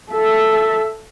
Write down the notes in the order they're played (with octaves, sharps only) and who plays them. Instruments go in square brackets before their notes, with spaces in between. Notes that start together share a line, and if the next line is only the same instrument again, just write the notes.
[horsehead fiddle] A4 E5